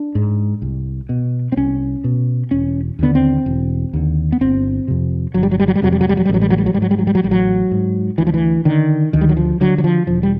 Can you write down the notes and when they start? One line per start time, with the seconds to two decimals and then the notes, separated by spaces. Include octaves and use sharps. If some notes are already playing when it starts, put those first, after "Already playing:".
Already playing: D4
0.15 G#2
0.62 C2
1.09 B2
1.52 C4
1.57 C2 C#4
2.04 B2
2.51 E1 C#4
2.99 D#2 D3 B3
3.15 C4
3.46 E1
3.93 D#2 D3
4.32 B3
4.41 G1 C4
4.88 F2 C3
5.34 G1 F#3
5.43 G3
5.51 F#3
5.60 G3
5.68 F#3
5.75 G3
5.82 F2 C3 F#3
5.92 G3
6.01 F#3
6.09 G3
6.17 F#3
6.25 G3
6.29 A1 F#3
6.41 G3
6.50 F#3
6.58 G3
6.66 F#3
6.74 G#2 G3
6.82 F#3
6.91 G3
6.99 F#3
7.07 G3
7.15 F#3
7.23 A1 G3
7.31 F#3
7.71 G#2
8.18 D2 E3
8.27 F3
8.34 E3
8.65 D3 D#3
9.13 D2 D#3
9.21 G3
9.29 F#3
9.37 F3
9.61 D3 F#3
9.78 F#3
9.84 F3
10.07 E1 F3
10.23 G3